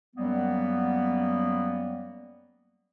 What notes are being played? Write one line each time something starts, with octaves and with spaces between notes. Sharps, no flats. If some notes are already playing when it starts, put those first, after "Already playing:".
F#2 F#3 G3 A#3 B3